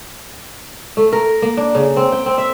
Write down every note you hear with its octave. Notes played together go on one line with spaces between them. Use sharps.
A3
A#4
A#3
D4
C#3
C4
G5
C4
E5